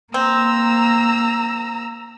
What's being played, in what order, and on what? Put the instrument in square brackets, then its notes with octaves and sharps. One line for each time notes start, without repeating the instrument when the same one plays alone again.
[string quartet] A#3 [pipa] C4 [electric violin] A#5 E6